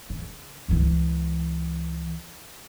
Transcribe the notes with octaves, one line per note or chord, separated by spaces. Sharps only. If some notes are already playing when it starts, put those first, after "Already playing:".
C#3
C#2 E3